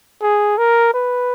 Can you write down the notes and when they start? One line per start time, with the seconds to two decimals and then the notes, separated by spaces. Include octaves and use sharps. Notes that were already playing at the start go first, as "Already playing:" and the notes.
0.22 G#4
0.58 A#4
0.94 B4